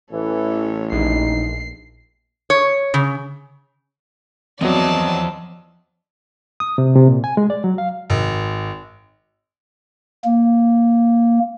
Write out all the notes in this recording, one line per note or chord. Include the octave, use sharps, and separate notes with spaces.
A1 E3 A4 C#5
A#1 D#4 C7
C#5
C#3
E2 F3 F#3 B3 C4 D5 D#5 A5
D#6
C3
C3
A#2
G#5
G#3
D5
F#3
F5
G#1
A#3